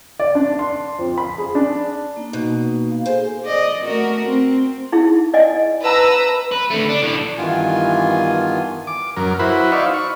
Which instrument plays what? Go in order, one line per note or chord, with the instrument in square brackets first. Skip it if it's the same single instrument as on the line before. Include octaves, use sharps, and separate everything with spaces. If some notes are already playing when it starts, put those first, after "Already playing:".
[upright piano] D5
D4
C6
F2
B5
G#4
D4
[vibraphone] A#3 D#4
[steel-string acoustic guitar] B2
[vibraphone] F5
[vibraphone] G#4 A4 G#5 [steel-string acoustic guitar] C5
[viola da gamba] D5 D#5
A3 F#4 A#4
C4
[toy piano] D#4 E4 G#4
D5 D#5 G#5
[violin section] B4 A#5 E6 [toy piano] A5
[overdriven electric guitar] B4
D3 A3
D4
A2 D3
[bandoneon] G2 D#3 E3 B3 F4 G#5
[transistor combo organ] D6
F#2 A#4
E4 F#4 B4 C5 B5
D#4 D5 E5 F5 C#6
C#6